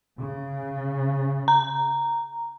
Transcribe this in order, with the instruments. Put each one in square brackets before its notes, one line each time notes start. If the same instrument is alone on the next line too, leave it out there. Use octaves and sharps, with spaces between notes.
[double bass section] C#3
[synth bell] A#5